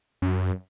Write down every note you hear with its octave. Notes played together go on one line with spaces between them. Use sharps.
F#2